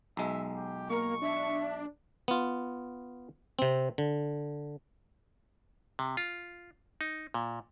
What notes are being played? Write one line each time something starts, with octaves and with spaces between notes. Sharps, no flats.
B1 G#3 E5
G4
A#3 A#4 C#6
D4 E5
B3 F4
C3 C4
D3
C3
F4
D#4
A#2